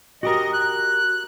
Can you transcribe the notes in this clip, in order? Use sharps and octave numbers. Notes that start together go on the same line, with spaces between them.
F#4 G4 A#4 D#5
F#6